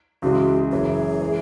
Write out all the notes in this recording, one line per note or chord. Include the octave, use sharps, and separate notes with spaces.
C#2 C#3 E3 G#3 F#4
F#1 F#2 E3 G#4
E3 G#3